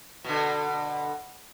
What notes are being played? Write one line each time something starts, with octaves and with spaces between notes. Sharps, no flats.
B2 D3